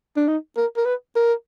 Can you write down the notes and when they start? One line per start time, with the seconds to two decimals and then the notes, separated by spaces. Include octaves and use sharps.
0.17 D4
0.28 D#4
0.57 A#4
0.77 A#4
0.85 B4
1.16 A#4